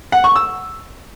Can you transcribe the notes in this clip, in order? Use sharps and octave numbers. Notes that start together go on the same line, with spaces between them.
F#5
C#6
E6